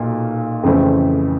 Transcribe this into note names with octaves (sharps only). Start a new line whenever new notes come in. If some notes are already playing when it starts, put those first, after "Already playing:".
Already playing: B1 A#2
F2 C#3 E3 A3 C4